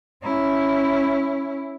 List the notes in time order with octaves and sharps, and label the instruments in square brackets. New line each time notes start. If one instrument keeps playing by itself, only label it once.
[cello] C#4 E4